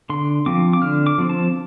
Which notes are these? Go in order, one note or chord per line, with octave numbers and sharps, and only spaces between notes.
D3 C6
F3 C4 D6
D6
D3 F6
D6
F3 C4
A5